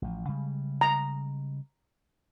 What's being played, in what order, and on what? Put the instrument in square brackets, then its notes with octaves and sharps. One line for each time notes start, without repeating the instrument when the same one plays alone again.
[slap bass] A1 F3
C#3 G3 G#3
[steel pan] A#5